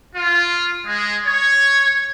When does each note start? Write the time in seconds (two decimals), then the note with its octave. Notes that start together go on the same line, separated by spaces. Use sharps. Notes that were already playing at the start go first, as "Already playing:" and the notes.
0.16 F4
0.85 G#3
1.24 C#5